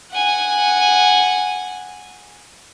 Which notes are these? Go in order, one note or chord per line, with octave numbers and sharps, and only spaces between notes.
F#5 G#5